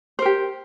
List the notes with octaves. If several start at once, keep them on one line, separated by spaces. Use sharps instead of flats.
G4 A#4 C5